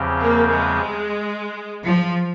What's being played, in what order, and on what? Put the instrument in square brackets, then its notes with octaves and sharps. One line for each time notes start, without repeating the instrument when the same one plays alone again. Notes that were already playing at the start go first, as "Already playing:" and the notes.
Already playing: [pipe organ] E2 C#3 F3 C4 G4
[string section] A#3
G#3
F3